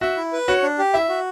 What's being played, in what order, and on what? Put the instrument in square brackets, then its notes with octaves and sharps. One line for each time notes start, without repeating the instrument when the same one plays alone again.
[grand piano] F#4 [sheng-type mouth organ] E5
[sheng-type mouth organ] E4
B4
[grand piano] F#4 [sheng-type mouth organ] C#5
[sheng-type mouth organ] D4
G4
[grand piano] E4 [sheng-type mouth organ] E5
[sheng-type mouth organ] F#4